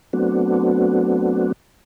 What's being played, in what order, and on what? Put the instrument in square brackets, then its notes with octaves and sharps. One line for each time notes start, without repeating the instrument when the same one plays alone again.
[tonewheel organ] F#3 A3 B3 C4 D4 F#4